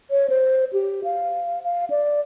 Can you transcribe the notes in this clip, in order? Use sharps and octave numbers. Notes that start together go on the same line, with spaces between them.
C#5
C5
G4
F5
F5
D5